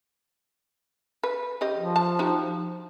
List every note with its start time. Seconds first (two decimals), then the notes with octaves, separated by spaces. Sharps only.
1.23 B4
1.61 C#3 G4 D#5
1.77 F3
1.96 A5
2.19 D#4 F#4 G4